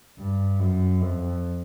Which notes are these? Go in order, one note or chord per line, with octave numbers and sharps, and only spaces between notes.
G2
F#2
F2